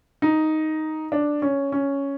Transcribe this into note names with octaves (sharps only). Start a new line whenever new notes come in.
D#4
D4
C#4
C#4